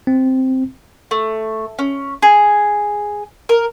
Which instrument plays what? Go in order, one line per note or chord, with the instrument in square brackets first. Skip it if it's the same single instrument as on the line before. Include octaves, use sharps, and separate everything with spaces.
[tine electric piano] C4
[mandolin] A3
C#4
G#4
A#4